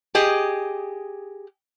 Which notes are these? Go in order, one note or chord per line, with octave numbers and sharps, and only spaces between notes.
G4 G#4 D#5